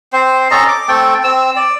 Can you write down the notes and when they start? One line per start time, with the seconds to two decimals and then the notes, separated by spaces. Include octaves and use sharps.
0.13 C4 C5
0.51 C#4 A4 D#5 A#5
0.68 D6
0.88 A3 C4 A4 G5
1.24 C4 E6
1.56 D5